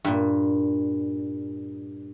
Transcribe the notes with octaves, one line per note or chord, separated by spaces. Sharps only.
G2 A#2